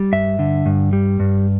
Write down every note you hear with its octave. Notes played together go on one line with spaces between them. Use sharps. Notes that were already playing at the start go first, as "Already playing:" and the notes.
Already playing: G3
G2 E5
D3
G2
G3
G2